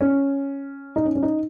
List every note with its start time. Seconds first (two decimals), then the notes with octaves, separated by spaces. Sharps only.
0.01 C#4
0.96 D#4
1.05 C#4
1.15 C#4
1.22 D#4